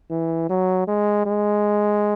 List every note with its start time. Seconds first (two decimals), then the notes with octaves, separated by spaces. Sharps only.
0.10 E3
0.49 F#3
0.87 G#3
1.26 G#3